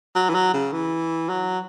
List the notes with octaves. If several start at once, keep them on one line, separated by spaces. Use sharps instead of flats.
F#3
E3
F#3
C#3
E3
F#3